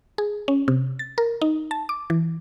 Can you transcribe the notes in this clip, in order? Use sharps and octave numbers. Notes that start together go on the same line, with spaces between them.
G#4
C#4
C3
A6
A#4
D#4
A5
D6
E3